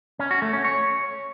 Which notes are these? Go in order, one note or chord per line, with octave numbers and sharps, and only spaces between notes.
C#4
F#4
A3
C#4
C#5